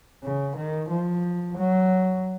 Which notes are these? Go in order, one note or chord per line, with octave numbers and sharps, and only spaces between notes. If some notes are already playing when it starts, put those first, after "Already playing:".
C#3
D#3
F3
F#3